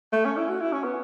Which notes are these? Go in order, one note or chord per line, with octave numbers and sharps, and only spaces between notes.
A3
C#4
E4
F#4
E4
C#4
B3